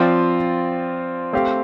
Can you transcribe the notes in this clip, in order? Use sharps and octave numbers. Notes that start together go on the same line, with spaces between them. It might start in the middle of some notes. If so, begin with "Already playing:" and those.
Already playing: F3 C4 F4 D5
A3 C4 G4 F5